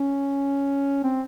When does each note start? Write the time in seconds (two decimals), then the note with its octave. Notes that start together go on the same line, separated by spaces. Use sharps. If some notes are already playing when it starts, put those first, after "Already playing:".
Already playing: C#4
1.04 C4